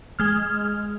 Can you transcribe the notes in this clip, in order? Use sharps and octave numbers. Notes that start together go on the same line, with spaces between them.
G#3 F6